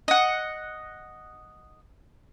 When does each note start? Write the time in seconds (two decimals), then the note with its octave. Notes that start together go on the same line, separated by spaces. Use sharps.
0.08 D#5 F#5